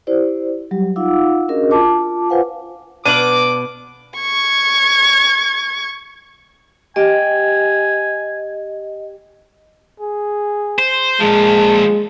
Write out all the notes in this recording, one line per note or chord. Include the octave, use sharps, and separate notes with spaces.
E4 G4 C5 D5
F#3 G3 G4
D#4 F4 F5 F#5 D6 E6
C#4 D4 F#4 G#4 A#4 D#5
F4 A5 D6
F4 B4 C5 F5 F#5 G#5
B2 D4 F5 D6 D#7 F#7
C#6 G#6
G4 D#5 G#5
G#4
C5
A#2 F3 G#3 A5